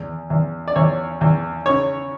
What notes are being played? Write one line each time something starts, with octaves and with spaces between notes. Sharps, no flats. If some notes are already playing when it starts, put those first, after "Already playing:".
Already playing: E2
E2
D5
E2 C#5
E2
C#3 C#5